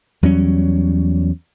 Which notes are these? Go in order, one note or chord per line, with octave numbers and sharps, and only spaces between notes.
E2 F#3 G3 C#4